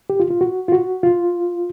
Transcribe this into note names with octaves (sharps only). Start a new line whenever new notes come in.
G4
F4
F4
F#4
F4
F#4
F4